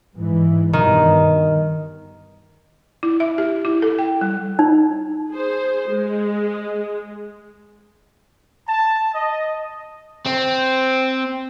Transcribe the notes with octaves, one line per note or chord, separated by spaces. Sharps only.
G#2 E3
G2 B2 D#3
E4
E5
G4
E4
A4
G5
G3
D#4
G#4 C5
G#3
A5
D#5
C4